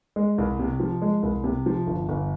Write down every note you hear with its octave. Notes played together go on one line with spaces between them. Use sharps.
G#3
C2
C3
F3
G#3
C2
C3
F3
G1
G1